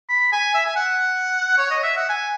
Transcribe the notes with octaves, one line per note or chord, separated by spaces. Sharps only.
B5
G#5
E5
G#5
F#5
C#5
D#5
E5
F#5
G#5